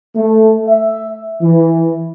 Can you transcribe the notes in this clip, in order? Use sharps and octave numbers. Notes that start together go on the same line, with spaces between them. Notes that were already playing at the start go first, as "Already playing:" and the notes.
A3
E5
E3